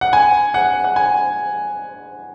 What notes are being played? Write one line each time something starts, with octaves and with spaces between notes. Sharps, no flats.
F#5
G#5
F#5
F#5
G#5